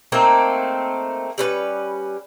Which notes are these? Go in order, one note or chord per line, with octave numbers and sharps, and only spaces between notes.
A3 A#3 C4 D#4
G3 C#4 B4